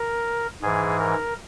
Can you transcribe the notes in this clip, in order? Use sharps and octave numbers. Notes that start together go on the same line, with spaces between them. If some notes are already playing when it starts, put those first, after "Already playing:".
Already playing: A#4
G#2 E3 G#4
A#4